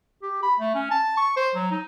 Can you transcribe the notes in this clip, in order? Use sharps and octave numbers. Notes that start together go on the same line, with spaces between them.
G4
B5
A3
C#4
A5
C#6
C5
F#3
D#4